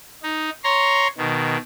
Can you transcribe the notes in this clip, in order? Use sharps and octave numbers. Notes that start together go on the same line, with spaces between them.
D#4
C#5 A#5 C6
B2 D#3